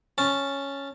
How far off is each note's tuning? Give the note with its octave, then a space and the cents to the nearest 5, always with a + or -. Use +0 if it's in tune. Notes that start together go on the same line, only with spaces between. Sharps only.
C#4 +0 A5 +0